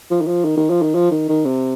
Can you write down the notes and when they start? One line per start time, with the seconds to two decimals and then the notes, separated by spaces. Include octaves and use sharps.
0.11 F3
0.21 D#3
0.27 F3
0.44 D#3
0.57 D#3
0.70 F3
0.82 D#3
0.94 F3
1.11 D#3
1.29 D#3
1.45 C3